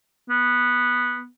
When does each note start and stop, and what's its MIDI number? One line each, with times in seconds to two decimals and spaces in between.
0.30 1.27 59